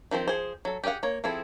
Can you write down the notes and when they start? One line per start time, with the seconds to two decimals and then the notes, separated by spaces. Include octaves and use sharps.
0.11 D#3 F3 C4 C5
0.28 F3 G#4 C5
0.65 F#3 A4
0.84 G4 G#4 D5 F5 F#5
1.03 A#3 C#5
1.24 F3 C4 E4 G#4 A4